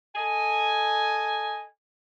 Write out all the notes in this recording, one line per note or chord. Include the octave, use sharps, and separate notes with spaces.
A4 D#5 G#5